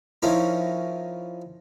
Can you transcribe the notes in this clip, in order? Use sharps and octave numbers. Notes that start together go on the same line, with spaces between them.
F3 C#4 D#4 E4 A#4